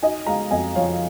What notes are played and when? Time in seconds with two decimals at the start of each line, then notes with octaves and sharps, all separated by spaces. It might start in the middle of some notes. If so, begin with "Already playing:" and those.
0.02 D#4 D#5 G#5
0.27 G#3 F5 A#5
0.51 F2 D#5 G#5
0.75 F3 C#5 F5